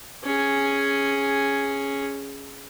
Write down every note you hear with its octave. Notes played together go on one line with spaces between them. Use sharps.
C#4 G#4